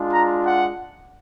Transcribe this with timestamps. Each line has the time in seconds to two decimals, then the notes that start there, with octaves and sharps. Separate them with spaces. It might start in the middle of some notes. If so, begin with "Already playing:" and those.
Already playing: G#3 D4 F4
0.12 A#5
0.46 F#5